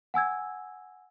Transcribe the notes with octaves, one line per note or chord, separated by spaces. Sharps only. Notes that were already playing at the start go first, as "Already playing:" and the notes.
F#5 G#5 E6 G#6